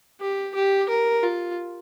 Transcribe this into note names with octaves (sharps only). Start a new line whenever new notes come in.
G4
G4
A#4
F4